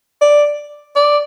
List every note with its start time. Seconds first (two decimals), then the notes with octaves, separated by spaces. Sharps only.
0.22 D5
0.96 D5